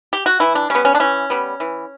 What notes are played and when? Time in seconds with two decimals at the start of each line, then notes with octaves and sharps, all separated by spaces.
0.13 G4
0.26 F#4
0.40 E3 E4
0.55 D4
0.70 G3 B3 C#4
0.85 C#4
0.95 D4
1.00 E3 C#4
1.30 G3 B3
1.60 E3